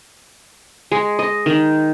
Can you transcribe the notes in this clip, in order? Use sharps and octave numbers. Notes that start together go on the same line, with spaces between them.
G#3
D#5
D#3